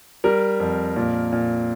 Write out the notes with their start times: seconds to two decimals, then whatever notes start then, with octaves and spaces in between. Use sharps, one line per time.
0.24 G3 A#4
0.60 F2
0.96 A#2
1.32 A#2